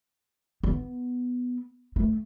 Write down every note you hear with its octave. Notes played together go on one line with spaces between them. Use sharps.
B3
A3